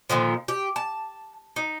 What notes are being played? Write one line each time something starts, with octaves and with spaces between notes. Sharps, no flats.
A#2 D3 D#3 F3
G4
A5
D#4